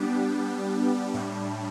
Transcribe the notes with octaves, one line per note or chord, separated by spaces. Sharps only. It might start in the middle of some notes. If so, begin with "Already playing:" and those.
Already playing: G3 B3 D4 G4
A2 G3 D4